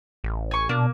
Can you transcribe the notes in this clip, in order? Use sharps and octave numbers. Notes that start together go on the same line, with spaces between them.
A1
G#5 C#6
B2 A#3 D4